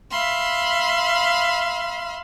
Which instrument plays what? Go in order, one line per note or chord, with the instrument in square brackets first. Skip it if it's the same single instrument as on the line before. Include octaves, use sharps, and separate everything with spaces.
[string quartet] E5 F5 B5 C6